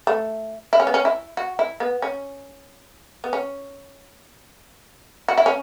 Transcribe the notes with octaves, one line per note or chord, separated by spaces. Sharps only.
A3
E4
C#4
B3
C#4
E4
F#4
E4
B3
C#4
B3
C#4
F#4
E4
C#4